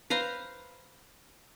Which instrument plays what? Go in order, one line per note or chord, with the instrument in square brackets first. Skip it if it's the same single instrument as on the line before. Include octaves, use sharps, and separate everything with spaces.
[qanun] B4 C5 F5 A#5